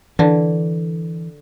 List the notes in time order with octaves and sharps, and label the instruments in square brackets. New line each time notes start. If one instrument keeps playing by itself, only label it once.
[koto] D3 [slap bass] E3